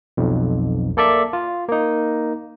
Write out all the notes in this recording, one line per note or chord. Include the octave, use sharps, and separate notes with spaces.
B1 F2
A#3 A4 D5 E5
F4
A#3 D#4